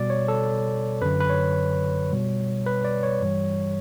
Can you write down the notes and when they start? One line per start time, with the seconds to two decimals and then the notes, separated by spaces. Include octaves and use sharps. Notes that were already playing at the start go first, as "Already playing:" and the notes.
Already playing: B2 G3 D5
0.10 C#5
0.28 A4
1.02 F#2 D3 F#3 B4
1.20 B4
1.30 C#5
2.12 B2 G3
2.66 B4
2.84 D5
3.03 C#5
3.21 G2 E3 G3